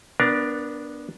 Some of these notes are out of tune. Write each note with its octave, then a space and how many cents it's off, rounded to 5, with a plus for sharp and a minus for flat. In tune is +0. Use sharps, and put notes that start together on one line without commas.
B3 -5 D4 +0 A#4 +20